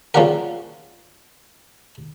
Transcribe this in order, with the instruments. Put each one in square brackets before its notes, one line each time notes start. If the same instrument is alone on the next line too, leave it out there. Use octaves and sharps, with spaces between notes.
[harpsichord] C#3 F3 G3 A#3 F#4 A#4